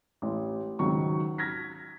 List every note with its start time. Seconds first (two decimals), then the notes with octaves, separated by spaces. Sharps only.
0.22 A1
0.79 C#2 G#2 D#3 F#3 C#6
1.38 F6 G#6 A#6 B6